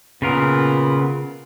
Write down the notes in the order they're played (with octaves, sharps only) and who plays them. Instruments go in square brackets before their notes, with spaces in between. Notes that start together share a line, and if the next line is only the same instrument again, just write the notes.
[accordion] A#2 B3 [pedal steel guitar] C#3 F4 A#4